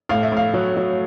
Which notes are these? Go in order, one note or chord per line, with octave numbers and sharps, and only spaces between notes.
A2 F5
E5
A2 F5
F#3
F#3